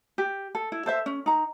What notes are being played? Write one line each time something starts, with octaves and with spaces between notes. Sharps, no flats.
G4
A4
E4
A4 C5 E5
C#4
D#4 A#5